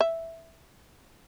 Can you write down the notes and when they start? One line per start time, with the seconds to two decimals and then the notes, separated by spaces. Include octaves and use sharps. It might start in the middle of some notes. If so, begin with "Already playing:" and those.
0.01 E5